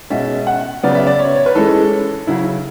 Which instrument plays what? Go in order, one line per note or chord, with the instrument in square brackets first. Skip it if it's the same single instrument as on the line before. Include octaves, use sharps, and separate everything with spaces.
[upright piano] B2 G#3 C#4 E5
F#5
C#3 F#3 B3 D5
E5
D5
C#5
C#5
B4
E3 G#3 C#4 A4
C#3 F#3 C#4 E4